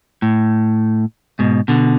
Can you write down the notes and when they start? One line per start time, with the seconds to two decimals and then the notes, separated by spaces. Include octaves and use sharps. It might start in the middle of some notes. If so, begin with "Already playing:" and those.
0.22 A2
1.39 G#2 B2
1.68 B2 D3